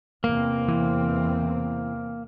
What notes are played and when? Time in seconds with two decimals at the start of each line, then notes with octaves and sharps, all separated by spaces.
0.24 E2 C3 A#3 C4
0.68 E3